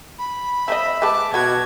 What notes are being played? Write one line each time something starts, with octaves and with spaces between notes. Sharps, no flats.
B5
F3 B4 D#5 E5
G#3 G4 B4 A5 D6
B2 B3 F#4 B4 G#6